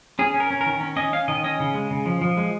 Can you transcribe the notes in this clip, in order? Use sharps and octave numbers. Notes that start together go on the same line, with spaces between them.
C#4 G#4
C#4
A#4
C#4
A#4
D#3
C#4
C#4 D#5
C#4 F5
D#3 D#5
C#4 D#5
C#3
G#3
C#3
F3
F3
G#3